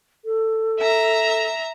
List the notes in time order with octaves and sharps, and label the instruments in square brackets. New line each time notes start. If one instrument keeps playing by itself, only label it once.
[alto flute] A4
[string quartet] E5 A#5